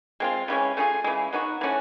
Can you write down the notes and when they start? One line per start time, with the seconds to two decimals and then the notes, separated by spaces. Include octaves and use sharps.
0.20 G#3 C4 F4
0.48 C#3 E3 G#3 C#4
0.77 A3 C#4 F4 G#4
1.04 C#3 E3 G#3
1.33 F#3 B3 D#4 F#4
1.61 E3 A3 C#4 F#4